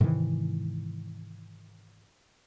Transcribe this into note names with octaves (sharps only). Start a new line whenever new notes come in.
G#2 C3 D#3 E3